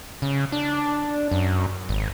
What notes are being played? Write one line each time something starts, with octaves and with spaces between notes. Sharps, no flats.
C#3
D4
F#2
G#1